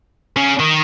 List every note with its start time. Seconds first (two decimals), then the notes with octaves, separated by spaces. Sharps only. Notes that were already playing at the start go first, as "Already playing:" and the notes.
0.37 C#3
0.60 D#3